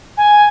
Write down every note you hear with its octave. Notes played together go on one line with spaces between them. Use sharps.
G#5